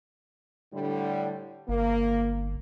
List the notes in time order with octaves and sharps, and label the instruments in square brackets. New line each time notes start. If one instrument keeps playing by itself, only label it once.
[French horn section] A2 D3 G3
[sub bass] G1 [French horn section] A#3